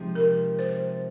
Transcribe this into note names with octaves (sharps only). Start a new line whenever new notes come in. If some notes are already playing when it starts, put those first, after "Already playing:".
Already playing: C3 F3 G#3 D#4
A#4
C5